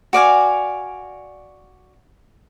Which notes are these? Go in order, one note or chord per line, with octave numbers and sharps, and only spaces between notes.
F#4 D5 F5 G#5